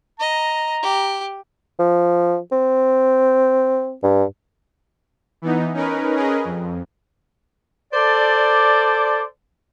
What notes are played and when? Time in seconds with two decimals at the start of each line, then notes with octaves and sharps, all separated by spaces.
0.20 D#5 A#5
0.82 G4
1.79 F3
2.52 C4
4.03 G2
5.42 E3 B3 D#4
5.74 C#4 D#4 A#4 B4
6.14 C#4 G#4 A#4 B4 D#5
6.44 F2
7.93 A4 C5 D5